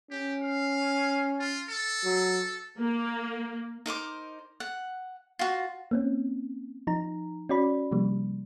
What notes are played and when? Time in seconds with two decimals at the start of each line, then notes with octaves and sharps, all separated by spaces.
0.10 C#4 G4
0.41 F5
1.39 F4
1.69 A4
2.04 F#3
2.79 A#3
3.86 D#4 A#4 C5 D6
4.60 F#5
5.39 F4 F#4
5.91 A#3 C4 C#4
6.87 F3 D#4 A#5
7.49 C#4 F#4 D5 B5
7.91 C3 F3 G3 A#3